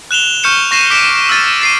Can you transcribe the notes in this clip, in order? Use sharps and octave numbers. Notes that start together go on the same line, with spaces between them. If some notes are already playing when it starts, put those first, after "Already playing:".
F#6 E7 F7 G7
C#6 F6 G6 C#7 E7
C#6 A#6 C7 D#7 E7
D6 B6 D7 E7
E6 F6 A6 D#7
A6 C7 D#7